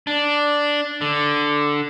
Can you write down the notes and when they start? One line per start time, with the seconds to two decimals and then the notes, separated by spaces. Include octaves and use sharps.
0.07 D4
1.01 D3